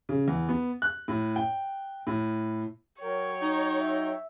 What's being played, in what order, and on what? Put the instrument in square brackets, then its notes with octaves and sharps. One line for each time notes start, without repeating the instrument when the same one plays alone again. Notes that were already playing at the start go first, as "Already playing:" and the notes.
[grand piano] C#3
E2
B3
F#6
A2
G5
A2
[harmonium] F#3 G5 [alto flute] A#4 [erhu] C#5
[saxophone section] D#4 [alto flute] A#5
[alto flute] E5